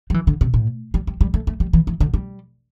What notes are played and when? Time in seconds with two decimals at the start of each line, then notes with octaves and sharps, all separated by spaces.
0.10 G3
0.14 E3
0.27 D3
0.41 C3
0.54 A2
0.94 G3
1.07 G3
1.21 G3
1.34 A3
1.47 A3
1.60 G3
1.73 E3
1.87 E3
2.00 D3
2.14 G3